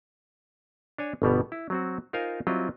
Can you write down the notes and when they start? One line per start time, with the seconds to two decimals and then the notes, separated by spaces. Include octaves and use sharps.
0.98 D4 C#5 G#5
1.22 G1 B2 G3 B3
1.52 E4
1.70 F#3 C4 F#4
2.13 D#4 F4 A#4 C5 F5 G#5
2.47 F#3 G3 C4 E4 F4 D#5